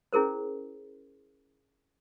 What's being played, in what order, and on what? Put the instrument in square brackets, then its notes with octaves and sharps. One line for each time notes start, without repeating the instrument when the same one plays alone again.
[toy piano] C#4 E4 G#4 A#4 C5